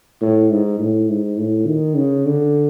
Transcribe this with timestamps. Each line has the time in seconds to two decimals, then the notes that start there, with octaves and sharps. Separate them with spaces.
0.21 A2
0.51 G#2
0.79 A2
1.09 G#2
1.38 A2
1.67 D#3
1.97 C#3
2.26 D3